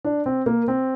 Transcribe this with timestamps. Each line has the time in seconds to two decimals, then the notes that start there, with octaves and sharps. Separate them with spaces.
0.05 D4
0.26 C4
0.46 A#3
0.68 C4